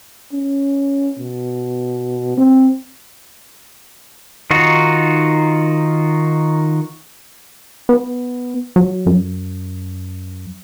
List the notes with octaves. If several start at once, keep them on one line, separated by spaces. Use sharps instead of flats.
C#4
B2
C4
D#3 D#4 F4 F#4
B3
F#3
F#2